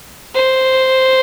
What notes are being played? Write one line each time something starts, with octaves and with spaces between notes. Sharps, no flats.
C5